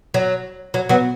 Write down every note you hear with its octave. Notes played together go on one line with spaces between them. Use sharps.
F#3
F#3
F#3 B3